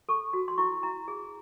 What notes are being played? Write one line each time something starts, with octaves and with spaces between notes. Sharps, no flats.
A4 C#6
F#4
C6
E4 C#6
E4 A#5
G#4